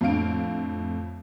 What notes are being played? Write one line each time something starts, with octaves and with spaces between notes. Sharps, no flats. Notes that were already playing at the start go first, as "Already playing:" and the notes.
F2 A2 D3 F5 D7